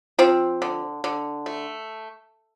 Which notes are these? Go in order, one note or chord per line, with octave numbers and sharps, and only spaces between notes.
F3 C4
D3
D3
A3